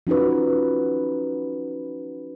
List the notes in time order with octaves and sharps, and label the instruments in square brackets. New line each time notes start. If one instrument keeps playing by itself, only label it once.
[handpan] F3 C#4 D#4 F#4 B4